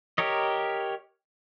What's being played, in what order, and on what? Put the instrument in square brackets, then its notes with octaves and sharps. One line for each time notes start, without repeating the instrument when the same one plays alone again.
[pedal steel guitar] G4 A#4 C#5 D#5